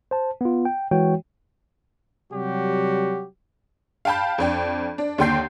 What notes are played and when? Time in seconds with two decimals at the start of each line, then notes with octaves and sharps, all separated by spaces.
0.11 C5 A5
0.41 B3 F4
0.65 G5
0.91 E3 G#3 F#4 C#5 G5
2.32 C3 F#3 G3 F#4 G4
4.05 F5 G5 A5 B5 G6
4.38 F2 D4 G5
4.98 D4
5.18 D#2 D3 G5 C6 G6 C7